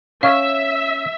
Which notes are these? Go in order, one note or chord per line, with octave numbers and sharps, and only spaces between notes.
C#4 E5 F5